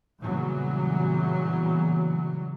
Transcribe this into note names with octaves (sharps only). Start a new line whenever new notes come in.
E2 A#2 C#3 E3 F#3 G3